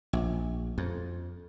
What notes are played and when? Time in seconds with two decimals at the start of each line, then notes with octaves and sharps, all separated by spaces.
0.13 A#1
0.78 F2